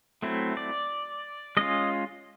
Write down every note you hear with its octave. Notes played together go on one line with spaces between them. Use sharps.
F#3 A3 C4 E4
D5
G#3 C#4 F4 D#5